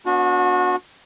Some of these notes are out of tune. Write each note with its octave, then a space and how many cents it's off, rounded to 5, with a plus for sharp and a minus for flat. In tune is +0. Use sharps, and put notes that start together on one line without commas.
B3 +0 D4 -25 F#4 -30